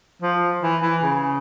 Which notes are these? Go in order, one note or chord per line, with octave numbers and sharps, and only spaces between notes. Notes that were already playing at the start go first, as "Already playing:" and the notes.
F3
E3
E3
C#3